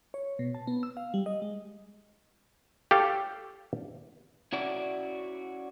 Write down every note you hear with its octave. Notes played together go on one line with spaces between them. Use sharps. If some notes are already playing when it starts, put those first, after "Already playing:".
C#5
B2
A5
B3
E6
F5
G3
D#5
G#3
G4 A4 C#5 F5
C#4 E4 F#4 D5